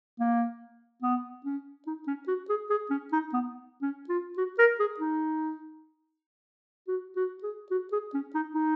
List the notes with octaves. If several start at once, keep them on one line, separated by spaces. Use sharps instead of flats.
A#3
B3
C#4
D#4
C#4
F#4
G#4
G#4
C#4
D#4
B3
C#4
F4
F#4
A#4
G#4
D#4
F#4
F#4
G#4
F#4
G#4
C#4
D#4
D#4